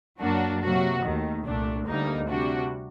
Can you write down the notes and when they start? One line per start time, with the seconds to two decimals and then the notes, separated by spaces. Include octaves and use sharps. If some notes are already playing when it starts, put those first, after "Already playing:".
0.20 F#2 F#3 A#3 D4 F#4
0.61 C3 F#3 A#3 F#4
1.02 D#2 D#3 A3
1.45 C2 A#2 A3 D4
1.86 D2 D3 G3 A#3 D#4
2.27 C3 G3 D4 F#4